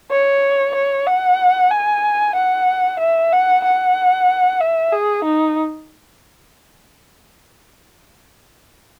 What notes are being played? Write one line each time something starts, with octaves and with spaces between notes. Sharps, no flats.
C#5
C#5
F#5
G#5
F#5
E5
F#5
F#5
E5
G#4
D#4